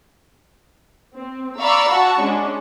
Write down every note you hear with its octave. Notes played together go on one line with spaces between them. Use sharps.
C4
D5 F5 A#5 B5 C#6 E6
F#4 F#5 A5 C#6
G#3 C#4 D4